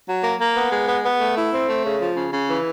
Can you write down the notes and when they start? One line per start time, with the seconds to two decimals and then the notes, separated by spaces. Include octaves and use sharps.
0.08 F#3
0.23 A#3
0.40 A#3
0.56 B3
0.72 G#3
0.88 B3
1.04 B3
1.20 A3
1.37 E4
1.52 C4
1.68 A3
1.85 C#3
2.01 F3
2.16 C#3
2.33 C#3
2.49 E3